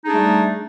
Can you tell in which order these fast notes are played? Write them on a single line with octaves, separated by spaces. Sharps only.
D#4 G#4 D4 G3 A3